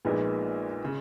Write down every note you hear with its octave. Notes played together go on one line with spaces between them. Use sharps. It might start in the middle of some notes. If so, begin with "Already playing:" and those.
A#1 A#2 G#3 B3 D#4
C#3